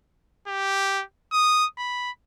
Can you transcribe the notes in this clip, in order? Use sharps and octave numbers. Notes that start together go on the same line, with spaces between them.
G4
D#6
B5